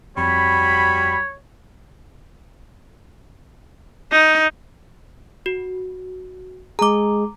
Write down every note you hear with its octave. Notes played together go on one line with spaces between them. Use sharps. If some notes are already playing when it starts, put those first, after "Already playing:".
F2 G3 F#4 C#5 B5
D#4
F#4
G#3 G#4 A#5 D6